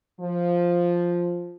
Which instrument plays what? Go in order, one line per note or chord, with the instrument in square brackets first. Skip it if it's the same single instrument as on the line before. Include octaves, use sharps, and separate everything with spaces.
[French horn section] F3